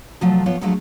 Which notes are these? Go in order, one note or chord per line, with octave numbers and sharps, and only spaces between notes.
C3 F3 F#3 A3 F4
F3 B3 F4 C#5
F2 F#3 G#3 A3 D4 F4